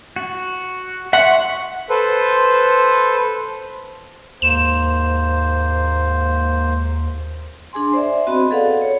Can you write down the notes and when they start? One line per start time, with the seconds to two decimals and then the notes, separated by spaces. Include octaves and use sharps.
0.16 F#4
1.13 E5 F#5 C6 C#6
1.89 A4 B4 C5
4.42 D#2 G#2 A#3 C5 E7
7.73 D4 G#4 G#5 C6
7.93 C5 D5 E5
8.26 B3 C4 F#4 D#5 B5
8.50 G#4 A4 B4 D5 F5 F#5
8.82 C#5